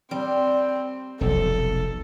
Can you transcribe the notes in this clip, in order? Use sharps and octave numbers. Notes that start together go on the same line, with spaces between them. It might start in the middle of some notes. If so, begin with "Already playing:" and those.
G3 C4
F1 B1 A4